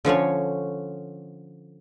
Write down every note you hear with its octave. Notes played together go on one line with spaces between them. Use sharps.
D3 F3 C#4 C#5